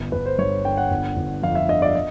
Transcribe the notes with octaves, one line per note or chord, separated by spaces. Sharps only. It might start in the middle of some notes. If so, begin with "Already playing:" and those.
Already playing: G1
G1 B4
C5
G2 C#5
D3 G5
F#5
G1
G1
F2 F5
E5
D3 D#5
D5
D#5